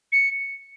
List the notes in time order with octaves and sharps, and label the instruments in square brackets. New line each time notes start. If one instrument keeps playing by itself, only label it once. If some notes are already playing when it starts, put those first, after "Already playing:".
[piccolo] C#7